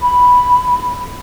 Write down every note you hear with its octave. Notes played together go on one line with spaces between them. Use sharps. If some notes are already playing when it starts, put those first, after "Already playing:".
B5